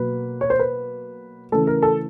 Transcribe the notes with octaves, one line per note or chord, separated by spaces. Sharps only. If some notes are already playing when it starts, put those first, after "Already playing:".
Already playing: B2 F#3 A#3 B4
C#5
C5
B4
C#3 E3 A3 A4
A#4
A4